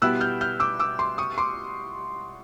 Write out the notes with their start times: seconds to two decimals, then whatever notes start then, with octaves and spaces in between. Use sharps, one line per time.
0.02 B2 G3 B3 E4 G4 E6 F#6
0.20 F6 G6
0.41 F6 G6
0.60 D6 E6
0.79 D6 E6
0.99 C6 D6
1.18 C#6 D#6
1.38 C6 D6